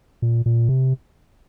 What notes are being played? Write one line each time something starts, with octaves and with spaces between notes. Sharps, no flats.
A#2
A#2
C3